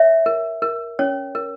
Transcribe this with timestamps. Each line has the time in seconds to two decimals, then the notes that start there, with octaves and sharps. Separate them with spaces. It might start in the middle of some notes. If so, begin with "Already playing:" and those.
Already playing: C#5 E5
0.26 A#4
0.62 A#4
0.99 C#4 C#5
1.35 A#4